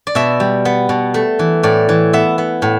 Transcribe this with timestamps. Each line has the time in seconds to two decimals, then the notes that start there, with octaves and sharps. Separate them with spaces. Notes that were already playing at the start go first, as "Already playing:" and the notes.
0.07 D5
0.15 B2 E5
0.40 G3
0.65 B3
0.89 B2
1.14 A3
1.39 E3
1.63 A2 D5
1.89 E3
2.13 B3 E5
2.38 B3
2.62 A2